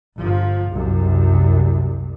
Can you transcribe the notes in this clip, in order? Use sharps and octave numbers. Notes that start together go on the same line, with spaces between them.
G1 F3
C2 F#2